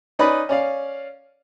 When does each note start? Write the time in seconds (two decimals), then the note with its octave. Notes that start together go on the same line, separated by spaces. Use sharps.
0.19 C#4 D#4 B4 D5 B5
0.49 C#4 D5 F5